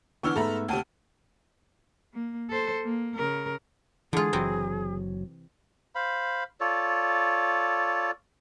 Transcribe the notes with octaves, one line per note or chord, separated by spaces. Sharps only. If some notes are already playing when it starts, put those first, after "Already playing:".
D3 E3 B3 C#6 E6 F6
G#2 A3 B3 A4 A#5 B5
D2 C3 G5 A5 D#7
A#3
A4 C5
A#3
C#3 A#4
D3 E3 G#3 F4 G#4
F#1 C3 E3 F#3 C4
C5 F5 B5
F4 A4 C#5 D5